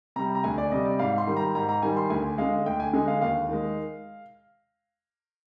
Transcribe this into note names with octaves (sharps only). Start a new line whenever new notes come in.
C3 G3 A#5
A#5
D2 G#5
D5
C3 G3 D#5
D5
G#2 F5
C6
D#3 G3
A#5
G#2 A#5
A#5
D#3 G3 G#5
C6
D2 G#5
D3 G#3 F5
D2 G5
G#5
D3 G#3 G#5
F5
D#2 F5
D#3 G#3